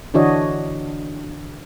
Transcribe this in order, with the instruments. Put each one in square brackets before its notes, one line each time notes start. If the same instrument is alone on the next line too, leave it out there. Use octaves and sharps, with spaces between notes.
[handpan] D3 E3 D4 F#4 C#5 D#5